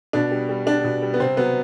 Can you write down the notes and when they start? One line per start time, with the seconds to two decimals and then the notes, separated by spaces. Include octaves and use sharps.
0.13 B2 D4
0.31 G3
0.49 G3
0.66 G3 D4
0.84 B2
1.02 G3
1.14 B3
1.20 C3 C4
1.37 F#3 B3